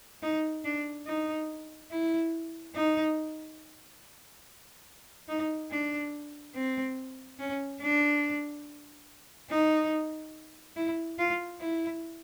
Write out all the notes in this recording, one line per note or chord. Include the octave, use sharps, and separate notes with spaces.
D#4
D4
D#4
E4
D#4
D#4
D4
C4
C#4
D4
D#4
E4
F4
E4